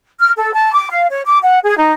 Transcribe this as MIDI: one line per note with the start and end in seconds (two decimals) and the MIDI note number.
0.20 0.31 89
0.36 0.53 69
0.54 0.71 81
0.74 0.87 86
0.90 1.06 77
1.10 1.20 73
1.27 1.37 86
1.42 1.59 78
1.63 1.76 68
1.78 1.91 63